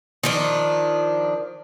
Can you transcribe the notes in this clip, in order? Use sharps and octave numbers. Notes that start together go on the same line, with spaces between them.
D#3 F3 D4